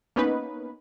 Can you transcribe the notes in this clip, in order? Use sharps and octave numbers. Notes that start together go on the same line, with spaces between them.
A#3 B3 C#4 D#4 B4